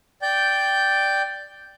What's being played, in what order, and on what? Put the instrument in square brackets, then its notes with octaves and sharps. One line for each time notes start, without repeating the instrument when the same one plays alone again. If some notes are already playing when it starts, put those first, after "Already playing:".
[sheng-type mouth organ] D5 G5 G6